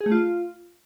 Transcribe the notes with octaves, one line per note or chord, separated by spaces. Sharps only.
G#4
A3
F4